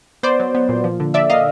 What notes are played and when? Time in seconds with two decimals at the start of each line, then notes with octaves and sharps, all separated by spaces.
0.23 B3 C5 D5
0.40 F#3
0.55 B3
0.69 A#2
0.84 F3
1.00 D3
1.14 D3 D5 E5
1.30 A#3 D#5 F5